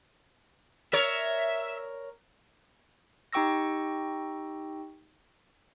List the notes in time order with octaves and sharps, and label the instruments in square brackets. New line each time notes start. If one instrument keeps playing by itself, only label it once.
[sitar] A#4 C#5 [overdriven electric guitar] E5
[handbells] D#4 G4 G5 C#6 E6 A#6